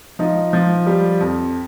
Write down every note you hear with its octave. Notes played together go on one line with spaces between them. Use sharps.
F3 D#4
F3
G3
F2